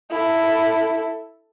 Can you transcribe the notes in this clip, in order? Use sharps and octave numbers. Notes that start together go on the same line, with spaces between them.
E4 A4